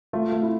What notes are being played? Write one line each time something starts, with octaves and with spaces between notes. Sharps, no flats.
A3 F4
A3
E4